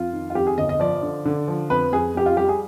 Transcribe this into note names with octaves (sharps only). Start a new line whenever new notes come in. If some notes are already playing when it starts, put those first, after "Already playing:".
Already playing: F2 F4
D#3
F4
F2 G4
G#4
G1 D#5
D#5
F3 D5
D3
D3
F3
F2 B4
F2 G#4
F2 G4
F4
G3 G4
G#4